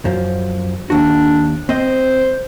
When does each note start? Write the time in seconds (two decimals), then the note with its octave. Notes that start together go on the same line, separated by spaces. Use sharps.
0.05 F#2 F3
0.90 D#2 D4 F#4
1.69 C4 C5 D#5